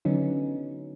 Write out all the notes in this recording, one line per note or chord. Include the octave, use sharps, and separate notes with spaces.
D3 F#3 B3 C#4 D#4